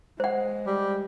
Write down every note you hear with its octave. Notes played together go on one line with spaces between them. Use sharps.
G#3 C5 F#5
G3